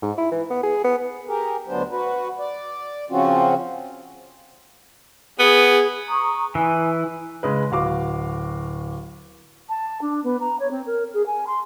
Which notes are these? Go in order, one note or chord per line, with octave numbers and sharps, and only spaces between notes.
G#2
E4
E3
B3
G#4
B3
G4 G#4 A#4
D2 B2 F#3 B3 D4 C5
F#4 B4
D5
C#3 F3 C4 C#4 F4 F#4
B3 G#4
A#5 C#6 D#6
E3 G#5
C#3 G#3 B4
D1 F#4 F5 D6
A5
D4
B3
A#5
C#5
C4
A#4
G#4
G#5
C6